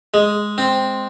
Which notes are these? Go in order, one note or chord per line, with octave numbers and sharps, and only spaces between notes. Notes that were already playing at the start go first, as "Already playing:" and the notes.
G#3
C4